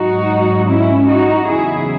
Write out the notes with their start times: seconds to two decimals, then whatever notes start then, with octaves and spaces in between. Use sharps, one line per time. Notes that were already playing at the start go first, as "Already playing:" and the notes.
Already playing: G#2 F#3 D#4 F#4
0.68 C#4 E4
1.08 D#4 F#4
1.47 E2 C#3 F#3 E4 G#4